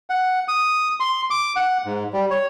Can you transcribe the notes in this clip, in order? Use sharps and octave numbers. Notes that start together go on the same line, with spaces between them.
F#5
D#6
C6
D6
F#5
G#2
G3
C#5